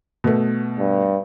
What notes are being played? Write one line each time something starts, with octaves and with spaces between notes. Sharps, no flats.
B2 A3
G2